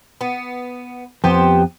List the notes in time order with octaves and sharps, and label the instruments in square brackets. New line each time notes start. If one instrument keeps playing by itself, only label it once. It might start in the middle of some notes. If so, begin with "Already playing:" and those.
[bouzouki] B3
[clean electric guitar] F2 [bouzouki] B3 G4 C5